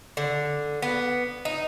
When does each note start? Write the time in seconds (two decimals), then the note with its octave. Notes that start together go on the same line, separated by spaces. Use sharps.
0.17 D3
0.82 B3
1.45 D#4